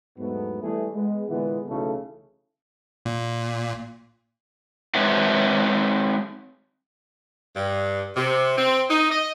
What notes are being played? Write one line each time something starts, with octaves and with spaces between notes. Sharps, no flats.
E2 G#2 F#3 A3 B3
E3 G3 A3 B3 G#4
G#3 B3
A#2 D3 E3 G#3 B3
B1 C#3 E3 A3 D#4 A4
A#2
G#3 C4 B4 C#5 E5 F#5
G2
C3
C4
D#4
D#5